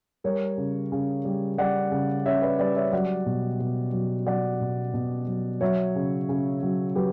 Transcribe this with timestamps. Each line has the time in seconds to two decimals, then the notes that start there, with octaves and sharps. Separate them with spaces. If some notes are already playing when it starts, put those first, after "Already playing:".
0.24 G3 A#4 C#5
0.58 C#3
0.92 C#3
1.25 G3
1.58 G3 D5 F#5
1.92 C#3
2.26 C#3 C#5 E5
2.42 B4 D5
2.59 G3 B4 D5
2.76 C#5 E5
2.92 F#3 D5 F#5
3.26 B2
3.60 B2
3.93 F#3
4.26 F#3 D5 F#5
4.61 B2
4.94 B2
5.27 F#3
5.61 F#3 C#5 E5
5.95 C#3
6.29 C#3
6.63 F#3
6.95 F#3 G4 B4